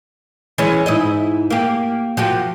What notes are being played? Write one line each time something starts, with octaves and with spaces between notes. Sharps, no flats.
E3 G#3 C#4
G#2 E4 D#5
A#3 G4
F3 F#4 G4